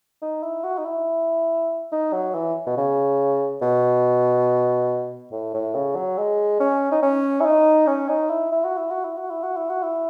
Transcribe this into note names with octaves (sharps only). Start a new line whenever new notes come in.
D#4
E4
F#4
D#4
E4
D#4
F#3
E3
B2
C#3
B2
A2
A2
C#3
F#3
G#3
C#4
D#4
C#4
E4
D#4
C#4
D#4
E4
E4
F#4
E4
F#4
E4
F#4
E4
F#4
E4
F#4
E4